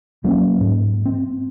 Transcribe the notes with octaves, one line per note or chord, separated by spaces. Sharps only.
D#2 F#3 A#3 C#4
G#2
C4